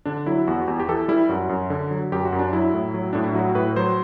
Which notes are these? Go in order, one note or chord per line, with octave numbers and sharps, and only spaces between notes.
D3 D4
F#3 E4
E2 F#4
E2 G4
G4
E3 A4
G3 E4
F#2 F#4
F#2
D3
F#3
F#2 G4
F#4
F#2
D4
F#3 E4
A2
F#3
A2 D4
E4
F#3 F#4
A2 B4
F#3 C5